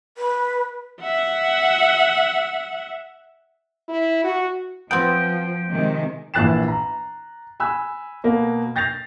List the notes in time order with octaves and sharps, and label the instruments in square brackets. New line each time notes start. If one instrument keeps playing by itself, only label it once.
[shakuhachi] B4
[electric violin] E5 F#5
[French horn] E4
F#4
[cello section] F3 [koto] B3 C4 [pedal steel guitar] G5
[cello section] C3 D#3 G#3
[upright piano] A#1 E3 F#6 A6 C7 E7
A#5
G#5 B5 E6 F#6
B2 A#3
G6 A6 A#6 C7 F7